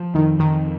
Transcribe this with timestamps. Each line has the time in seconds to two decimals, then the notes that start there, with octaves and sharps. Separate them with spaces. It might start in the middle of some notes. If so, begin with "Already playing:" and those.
Already playing: F3
0.15 F2 D#3
0.39 F2 D#3